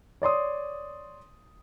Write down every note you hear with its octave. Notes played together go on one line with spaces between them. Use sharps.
C#5 D5 C6 D#6